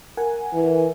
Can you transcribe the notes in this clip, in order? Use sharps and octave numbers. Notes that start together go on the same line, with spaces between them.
A#4 F#5 G#5
E3